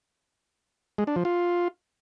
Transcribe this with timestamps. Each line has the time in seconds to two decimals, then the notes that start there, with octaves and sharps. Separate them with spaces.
0.98 G#3
1.07 D4
1.16 F3
1.25 F4